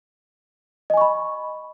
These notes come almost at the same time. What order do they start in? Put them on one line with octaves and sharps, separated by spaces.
D#5 G#5 C#6 B5